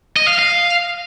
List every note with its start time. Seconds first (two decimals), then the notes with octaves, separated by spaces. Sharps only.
0.16 D#5
0.28 F5
0.39 F5